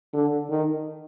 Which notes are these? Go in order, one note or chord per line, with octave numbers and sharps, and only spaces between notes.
D3
D#3